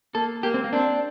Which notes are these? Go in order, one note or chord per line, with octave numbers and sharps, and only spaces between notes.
A#3 A4
A#3 G4
C4
A#3
C4 D4